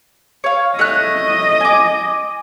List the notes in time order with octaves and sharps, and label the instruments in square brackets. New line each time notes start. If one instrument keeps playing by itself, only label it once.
[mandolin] C#5 F5
[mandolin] A3 C#5 F#6 [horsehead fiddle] D#5
[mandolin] G#5 D6